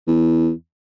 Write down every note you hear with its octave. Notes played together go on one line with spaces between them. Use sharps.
E2